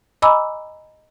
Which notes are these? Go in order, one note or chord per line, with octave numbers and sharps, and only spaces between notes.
D#5 G#5 A#5 B5 D6 E6